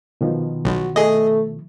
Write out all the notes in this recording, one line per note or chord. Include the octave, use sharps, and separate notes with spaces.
B2 D#3 F3
B1 F#4
A3 G#4 D#5